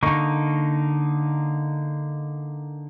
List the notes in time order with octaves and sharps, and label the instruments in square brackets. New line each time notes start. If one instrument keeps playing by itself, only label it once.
[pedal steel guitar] D3 A#3 D#4 C#6